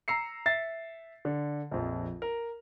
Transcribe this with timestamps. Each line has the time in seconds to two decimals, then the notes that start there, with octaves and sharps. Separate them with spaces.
0.08 A#5 E6 C7 C#7
0.46 E5 A6 C7
1.25 D3
1.71 A#1 F2
2.22 A#4